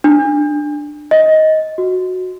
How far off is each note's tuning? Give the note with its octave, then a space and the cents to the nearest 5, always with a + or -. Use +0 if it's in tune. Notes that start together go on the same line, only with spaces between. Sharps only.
D4 +15
D#5 +15
F#4 -5